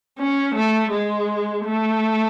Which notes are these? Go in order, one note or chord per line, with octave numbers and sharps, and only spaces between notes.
C#4
A3
G#3
A3